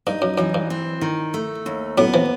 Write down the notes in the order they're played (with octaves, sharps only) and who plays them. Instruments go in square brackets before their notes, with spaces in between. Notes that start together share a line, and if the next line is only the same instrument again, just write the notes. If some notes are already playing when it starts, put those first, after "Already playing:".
[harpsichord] G2 [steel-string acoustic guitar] D#4
[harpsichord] F#2
[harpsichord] F#2 [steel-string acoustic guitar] E3
[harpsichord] G2
[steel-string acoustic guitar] C4
D#3
A3
D#2
[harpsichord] F#2 A2 [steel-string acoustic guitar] B3
[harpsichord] C3 E3